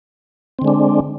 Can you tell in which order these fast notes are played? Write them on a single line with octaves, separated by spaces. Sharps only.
C4 D3 G#3 D4